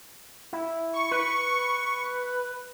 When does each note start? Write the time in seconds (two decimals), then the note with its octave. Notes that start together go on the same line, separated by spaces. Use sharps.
0.53 E4
0.94 C#6
1.11 B4